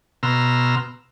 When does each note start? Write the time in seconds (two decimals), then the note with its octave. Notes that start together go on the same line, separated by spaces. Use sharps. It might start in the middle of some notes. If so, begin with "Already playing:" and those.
0.23 B2 A#5 C6 E6 F6